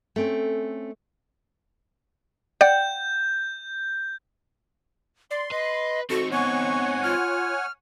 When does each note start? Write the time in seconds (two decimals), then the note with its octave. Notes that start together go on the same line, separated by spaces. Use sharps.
0.16 A3 C4 C#4
2.61 D5 F#5 G5 G6
5.31 D5 C6
5.51 B4 D#5
6.10 C4 D#4 F#4 A4 C#6
6.32 B3 C#5 F#5 G#5 C#6
7.03 F4 F6